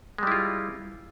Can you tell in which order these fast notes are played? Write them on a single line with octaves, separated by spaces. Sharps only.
G#3 G3 E4 F4